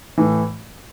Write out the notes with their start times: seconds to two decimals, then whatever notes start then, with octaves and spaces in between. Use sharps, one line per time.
0.18 A2 E3